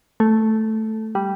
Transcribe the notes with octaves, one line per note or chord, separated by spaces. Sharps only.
A3
G3